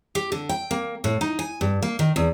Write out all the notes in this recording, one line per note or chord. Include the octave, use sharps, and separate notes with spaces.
G4
D3
G5
A#3
A2
D#4
G#5
G2
A#3
D#3
E2